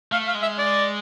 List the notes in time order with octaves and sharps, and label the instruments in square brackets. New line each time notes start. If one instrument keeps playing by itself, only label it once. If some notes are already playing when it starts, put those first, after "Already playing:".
[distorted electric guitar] A3 [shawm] F5
[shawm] F5
[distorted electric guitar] G#3
[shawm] E5
D5